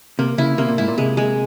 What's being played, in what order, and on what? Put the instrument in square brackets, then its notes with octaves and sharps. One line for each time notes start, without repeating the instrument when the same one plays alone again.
[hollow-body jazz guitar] C3 [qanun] A#3
[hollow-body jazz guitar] C#3 [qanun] E4
[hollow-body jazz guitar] C3 [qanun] A#3
[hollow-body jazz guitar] A#2
[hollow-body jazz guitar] G#2 [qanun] E4
[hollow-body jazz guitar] A#2
[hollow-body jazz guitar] C3 [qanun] G#3
[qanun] G#3